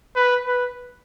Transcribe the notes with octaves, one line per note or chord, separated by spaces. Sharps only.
B4
B4